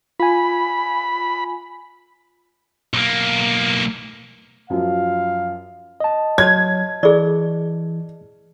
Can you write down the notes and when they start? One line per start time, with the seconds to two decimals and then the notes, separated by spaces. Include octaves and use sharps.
0.20 F4 G#5 B5
2.94 B1 A#3
4.70 F#2 F3 F#3 F5
6.00 D#5 A5
6.38 F#3 F#4 C#5 G#6
7.03 E3 G#4 D5